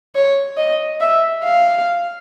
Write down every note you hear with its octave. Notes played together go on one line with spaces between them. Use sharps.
C#5
D#5
E5
F5